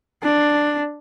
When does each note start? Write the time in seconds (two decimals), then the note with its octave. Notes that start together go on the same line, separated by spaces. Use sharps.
0.23 D4